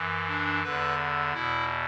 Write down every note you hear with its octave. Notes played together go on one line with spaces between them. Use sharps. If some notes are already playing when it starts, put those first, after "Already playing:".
Already playing: F#2 E3
D4
E2 D3 B4
E2 B2 E4